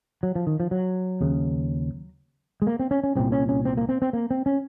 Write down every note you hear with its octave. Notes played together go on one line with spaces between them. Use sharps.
F#3
F3
D#3
F3
F#3
D#2 C#3
G#3
A#3
C4
C#4
C#4
C2 A#2 C4
C#4
C#4
C4
A#3
C4
C4
A#3
C4
C#4